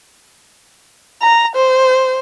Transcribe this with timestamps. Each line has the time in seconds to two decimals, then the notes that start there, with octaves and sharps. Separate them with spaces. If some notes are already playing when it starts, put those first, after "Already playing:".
1.22 A#5
1.56 C5